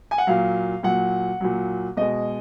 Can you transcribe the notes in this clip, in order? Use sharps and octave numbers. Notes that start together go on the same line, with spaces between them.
G#5
F#5
A#2 F#3 F5
A#2 F#3 F#5
A#2 F#3
B2 G#3 D#5